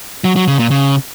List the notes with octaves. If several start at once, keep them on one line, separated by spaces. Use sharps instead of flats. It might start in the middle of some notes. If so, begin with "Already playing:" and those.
F#3
F#3
C#3
A#2
C#3